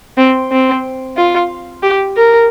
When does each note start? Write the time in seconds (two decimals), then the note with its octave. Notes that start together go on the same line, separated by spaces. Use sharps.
0.18 C4
0.52 C4
1.17 F4
1.83 G4
2.17 A#4